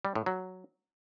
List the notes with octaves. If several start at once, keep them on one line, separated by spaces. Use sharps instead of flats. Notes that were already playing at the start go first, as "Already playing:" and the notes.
G3
A2
F#3